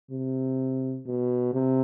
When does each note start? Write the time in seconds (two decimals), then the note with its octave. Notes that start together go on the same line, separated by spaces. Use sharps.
0.11 C3
1.06 B2
1.54 C3